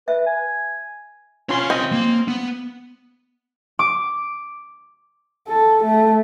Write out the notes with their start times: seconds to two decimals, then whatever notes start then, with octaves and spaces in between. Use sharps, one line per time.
0.08 B4 E5
0.27 G#5
1.49 C#4 F4 C#5 F5 C6
1.70 C4 D#5
1.92 A#3
2.28 B3
3.79 D6
5.48 A4
5.84 A3